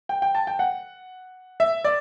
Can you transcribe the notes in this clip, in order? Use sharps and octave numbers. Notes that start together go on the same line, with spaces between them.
G5
G5
A5
G5
F#5
E5
D5